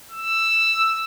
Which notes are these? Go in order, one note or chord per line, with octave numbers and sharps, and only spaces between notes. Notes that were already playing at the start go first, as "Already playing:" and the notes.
E6